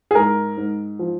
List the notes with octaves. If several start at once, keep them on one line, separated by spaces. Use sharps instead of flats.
G#4
G#2 A#4
G#2
F3